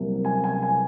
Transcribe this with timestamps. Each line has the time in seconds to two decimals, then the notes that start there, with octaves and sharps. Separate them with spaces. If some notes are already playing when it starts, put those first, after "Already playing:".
Already playing: C2 C3 F#3 A#3
0.25 G#5
0.44 G#5
0.62 G#5